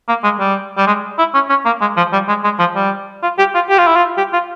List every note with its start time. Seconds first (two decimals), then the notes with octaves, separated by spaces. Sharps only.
0.09 A#3
0.24 G#3
0.40 G3
0.77 G3
0.87 G#3
1.19 E4
1.34 C#4
1.50 C#4
1.65 A#3
1.81 G#3
1.97 F3
2.13 G3
2.29 G#3
2.44 G#3
2.59 F3
2.75 G3
3.23 F4
3.39 G4
3.55 F4
3.69 G4
3.78 F4
3.87 E4
3.96 F4
4.17 G4
4.33 F4